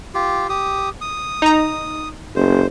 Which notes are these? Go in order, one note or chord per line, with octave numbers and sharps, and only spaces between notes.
F4 G4
G4 D#6
D#6
D#4 A#5
F#1 C5